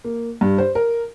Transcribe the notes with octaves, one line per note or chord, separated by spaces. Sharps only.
A#3
G2
C5
A#4